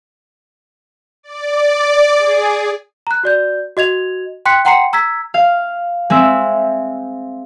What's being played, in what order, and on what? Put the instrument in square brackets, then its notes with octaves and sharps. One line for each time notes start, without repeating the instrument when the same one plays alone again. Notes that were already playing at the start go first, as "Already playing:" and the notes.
[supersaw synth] D5
G#4
[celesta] A#5 F#6
F#4 D5 G6
F#4 D#5 G#6 F7
G5 C6 F#6 B6 C#7
F#5 G5 A#5 C6 C7 C#7
A#5 E6 G#6 B6
[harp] F5
G#3 C4 E5